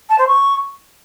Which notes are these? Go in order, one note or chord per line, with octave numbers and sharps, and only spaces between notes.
A5
C5
C#6